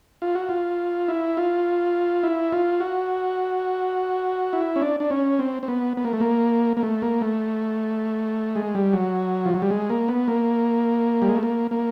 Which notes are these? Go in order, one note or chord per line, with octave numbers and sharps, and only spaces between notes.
F4
F#4
F4
E4
F4
E4
F4
F#4
E4
C#4
D4
D4
C#4
C4
C4
B3
B3
A#3
A3
A#3
A#3
A3
A#3
A3
G#3
G3
F#3
F3
F#3
G3
G#3
A#3
B3
A#3
G3
G#3
A3
A#3
A#3